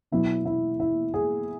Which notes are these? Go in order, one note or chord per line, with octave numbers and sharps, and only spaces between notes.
B2 F#3 B3 E4
E4
E4
G#4